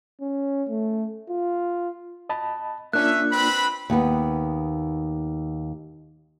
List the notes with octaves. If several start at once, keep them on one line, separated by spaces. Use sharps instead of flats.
C#4
A3
F4
D#5 A5 B5
A#3 C#4 D4 F4 E5 F#6
C4 B4 B5
D#2 B3